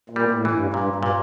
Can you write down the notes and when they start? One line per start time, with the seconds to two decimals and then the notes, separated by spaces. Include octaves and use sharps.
0.10 A#2
0.16 G3
0.31 A2
0.45 E3
0.52 G2
0.74 G2 A#2
0.96 G2
1.03 A#2